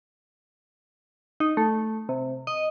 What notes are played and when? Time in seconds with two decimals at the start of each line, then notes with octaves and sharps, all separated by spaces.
1.40 D#4
1.57 A3
2.09 C3
2.47 D#5